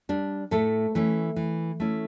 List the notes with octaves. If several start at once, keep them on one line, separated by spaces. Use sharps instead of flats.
G3 D4
A2 A3 A4
E3 A3 C#4
E3
A3 C#4 E4